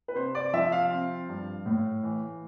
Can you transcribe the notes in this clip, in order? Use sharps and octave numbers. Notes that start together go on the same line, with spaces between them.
B4
C3 C5
D5
F3 E5
F5
C4
G2
A2
E3